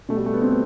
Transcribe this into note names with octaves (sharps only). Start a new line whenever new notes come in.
B2 A3
G3
A3
B3
B2 C4
B4